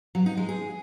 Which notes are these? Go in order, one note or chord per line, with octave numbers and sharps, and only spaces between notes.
F#3
D#4
G#3
G#4